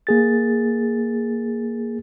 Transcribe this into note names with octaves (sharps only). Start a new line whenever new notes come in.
A#3 G#4 A6